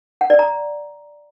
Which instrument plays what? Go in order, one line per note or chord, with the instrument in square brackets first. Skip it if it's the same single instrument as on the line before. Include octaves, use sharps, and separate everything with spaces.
[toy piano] F#5
D5
A#5